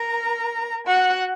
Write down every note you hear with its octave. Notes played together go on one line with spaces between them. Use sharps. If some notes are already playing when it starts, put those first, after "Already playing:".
Already playing: A#4 A#5
F#4 F#5